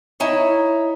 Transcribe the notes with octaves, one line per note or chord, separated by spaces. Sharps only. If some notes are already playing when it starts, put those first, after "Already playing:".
D#4 E4 C#5